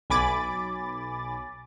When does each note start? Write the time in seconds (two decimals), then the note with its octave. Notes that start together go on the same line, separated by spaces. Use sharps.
0.10 B1 G#5 B5 D6 A6